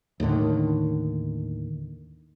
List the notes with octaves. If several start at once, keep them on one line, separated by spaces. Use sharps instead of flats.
D#2 A2 D3 D#3